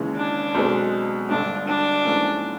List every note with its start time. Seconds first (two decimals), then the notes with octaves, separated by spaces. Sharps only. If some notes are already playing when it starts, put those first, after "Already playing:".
Already playing: D#2 C#3 E3 G#3
0.16 D4
0.55 B1 B2 G#3 C4
1.29 G#1 G2 D3 D4
1.68 D4
2.05 A#1 G#2 E3 A3 C#4